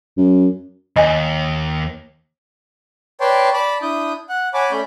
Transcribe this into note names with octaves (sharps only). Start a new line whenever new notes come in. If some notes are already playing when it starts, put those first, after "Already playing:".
F#2
D#2 D#5 G#5
B4 C#5 D5 G5 A5 C6
D5 A5 B5
D4 E4 D#6 G6
F#5 F#6
C#5 F#5 G#5 A5 B5 D6
A3 C#4 D5 B5 G6